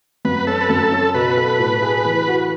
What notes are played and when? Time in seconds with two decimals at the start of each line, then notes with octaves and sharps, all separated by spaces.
0.25 F#2 B4
0.47 C#4 A4
0.61 B4
0.69 F#2 A4
0.92 C#4
1.14 B2 B4
1.37 A4
1.59 A2
1.82 G#4
2.05 E3
2.27 F#4